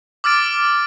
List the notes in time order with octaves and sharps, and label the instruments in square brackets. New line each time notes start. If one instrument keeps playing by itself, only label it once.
[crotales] D6 E6 F6 A6 D7